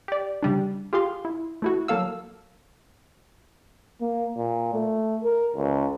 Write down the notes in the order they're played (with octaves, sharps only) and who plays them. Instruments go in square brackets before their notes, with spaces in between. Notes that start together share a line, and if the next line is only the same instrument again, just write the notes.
[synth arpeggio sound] G4 D5
C#3 G3 D4
F4 G4 G#4 F5 C6
E4
A3 E4 F#4
F#3 A#3 A4 F5 E6
[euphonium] A#3
A#2
A3
A#4
C#2